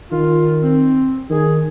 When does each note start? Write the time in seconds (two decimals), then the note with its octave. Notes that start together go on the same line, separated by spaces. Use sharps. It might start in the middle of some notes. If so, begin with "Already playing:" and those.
0.12 D#3 F4
0.63 C4
1.30 D#3 G#4